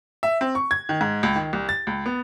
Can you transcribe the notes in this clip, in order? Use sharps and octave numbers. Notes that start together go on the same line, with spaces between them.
E5
C4
C#6
G#6
D#3
G#2
C#2
D#3
C2
A6
C#2
B3